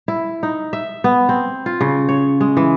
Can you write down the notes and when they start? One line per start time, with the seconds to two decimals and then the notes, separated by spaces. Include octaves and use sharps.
0.08 E4
0.43 D#4
0.73 E5
1.04 B3
1.29 C4
1.66 F4
1.81 C#3
2.09 C#5
2.41 G#3
2.57 E3